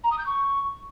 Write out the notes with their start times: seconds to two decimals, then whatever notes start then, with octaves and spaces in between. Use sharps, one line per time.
0.04 A#5
0.11 D#6
0.19 G6
0.26 C#6